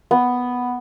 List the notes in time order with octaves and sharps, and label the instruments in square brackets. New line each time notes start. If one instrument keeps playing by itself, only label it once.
[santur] B3